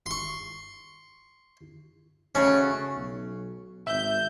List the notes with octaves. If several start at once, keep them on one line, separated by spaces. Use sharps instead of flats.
C6 C#6
C#3 A3 C#4 F#4
B1
G#1 E5 G6